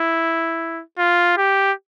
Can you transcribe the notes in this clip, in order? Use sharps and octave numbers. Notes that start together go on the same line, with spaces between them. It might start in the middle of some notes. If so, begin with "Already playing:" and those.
Already playing: E4
F4
G4